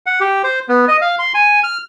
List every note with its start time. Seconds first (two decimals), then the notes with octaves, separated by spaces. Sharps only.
0.06 F#5
0.21 G4
0.44 C5
0.69 B3
0.88 D#5
1.01 F5
1.19 C6
1.35 G#5
1.64 F6